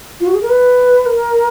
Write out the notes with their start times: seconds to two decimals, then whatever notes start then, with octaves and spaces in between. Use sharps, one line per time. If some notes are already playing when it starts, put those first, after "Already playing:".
0.20 F4
0.27 F#4
0.34 G#4
0.42 A#4
0.49 B4
1.06 A#4